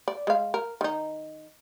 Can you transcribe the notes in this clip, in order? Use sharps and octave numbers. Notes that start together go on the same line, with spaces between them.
D5
G#3 F5
A#4
D#3 D#4